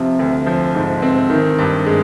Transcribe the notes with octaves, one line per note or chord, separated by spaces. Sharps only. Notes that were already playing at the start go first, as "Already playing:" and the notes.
Already playing: C3 F3
D2
F3
G#2
C4
D#3
G2
G#3